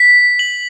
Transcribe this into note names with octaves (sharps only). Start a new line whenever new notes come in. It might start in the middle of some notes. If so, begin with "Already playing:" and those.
Already playing: B6
F#7